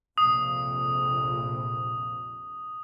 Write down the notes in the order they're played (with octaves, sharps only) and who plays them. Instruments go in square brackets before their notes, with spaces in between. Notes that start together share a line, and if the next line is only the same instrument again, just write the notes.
[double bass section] A#1 F2 C3 [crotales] D#6